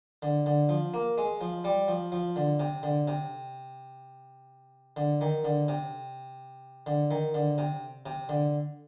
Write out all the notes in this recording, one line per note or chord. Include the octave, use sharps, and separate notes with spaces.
D3
D3
F3
A#3
G#3
F3
G3
F3
F3
D3
C3
D3
C3
D3
D#3
D3
C3
D3
D#3
D3
C3
C3
D3